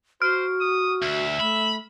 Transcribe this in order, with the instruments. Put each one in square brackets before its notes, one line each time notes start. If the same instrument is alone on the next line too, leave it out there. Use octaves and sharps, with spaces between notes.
[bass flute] F#4 [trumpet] C5 [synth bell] F6
[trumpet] D#6
[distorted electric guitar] D2 [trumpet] E5
[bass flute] A3 [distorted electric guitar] B5